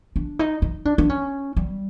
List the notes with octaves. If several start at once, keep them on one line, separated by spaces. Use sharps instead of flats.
D4
D#4
D#4
D4
D4
C#4
G3